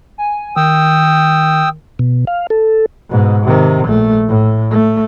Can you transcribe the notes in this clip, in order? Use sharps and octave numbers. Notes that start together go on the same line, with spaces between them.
G#5
D#3 G5 D#6 E6
B2
F5
A4
G#2 B2
C3 D#3
A#1 A3
A2
A3